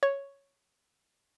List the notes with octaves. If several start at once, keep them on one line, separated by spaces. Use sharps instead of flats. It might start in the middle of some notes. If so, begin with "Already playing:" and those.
C#5